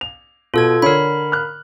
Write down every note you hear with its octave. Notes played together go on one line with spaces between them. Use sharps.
F7
B2 F4 A4 G#6
D3 A#4 C#5 B5
F6 F#6